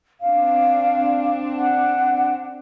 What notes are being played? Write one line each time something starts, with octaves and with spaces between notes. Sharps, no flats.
C4 D4 F5
F#5